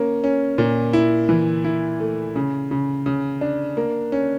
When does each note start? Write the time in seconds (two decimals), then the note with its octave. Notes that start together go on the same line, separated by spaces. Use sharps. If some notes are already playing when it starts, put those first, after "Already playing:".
Already playing: A#3 C#4
0.24 C#4
0.58 A#2
0.93 E4
1.29 E3
1.65 E4
2.00 A3
2.36 C#3
2.71 C#3
3.06 C#3
3.41 D4
3.77 A#3
4.12 C#4